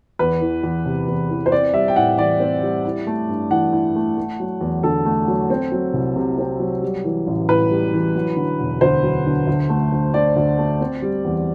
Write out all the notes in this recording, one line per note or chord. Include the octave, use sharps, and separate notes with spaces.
E2 B4
E3
E2
C3
E2
E3
C5
C4 D5
G3 E5
G5
A2 F#5
E3 D5
C4
G3
E4
A3
G2
E3 F#5
E4
A3
A3
F#3
E2
D3 A4
A3
F#3
C4
F#3
C2
C3
C4
F#3
G3
E3
A1
A2 B4
G3
E3
F#3
D3
E1
D2 C5
F#3
D3
D2
A3
D2
D3 D5
D2
A3
C4
G3
E2